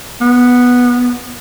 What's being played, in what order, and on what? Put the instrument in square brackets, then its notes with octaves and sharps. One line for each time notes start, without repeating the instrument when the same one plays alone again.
[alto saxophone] B3